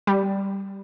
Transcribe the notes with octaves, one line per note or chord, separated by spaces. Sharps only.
G3